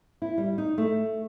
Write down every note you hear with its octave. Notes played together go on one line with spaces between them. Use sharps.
E4
G3
D#4
A3